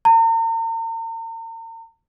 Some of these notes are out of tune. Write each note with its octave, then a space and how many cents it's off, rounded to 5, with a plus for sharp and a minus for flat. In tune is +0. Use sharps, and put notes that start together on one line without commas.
A#5 -40